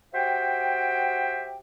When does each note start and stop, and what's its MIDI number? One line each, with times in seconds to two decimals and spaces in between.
0.14 1.59 66
0.14 1.59 67
0.14 1.59 72
0.14 1.59 76
0.14 1.59 79